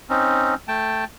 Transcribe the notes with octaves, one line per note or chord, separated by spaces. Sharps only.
C4 C#4 D#4
A3 G5 A5